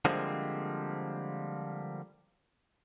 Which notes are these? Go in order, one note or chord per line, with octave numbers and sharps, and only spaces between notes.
D3 F3 G3 G#3 A#3 C4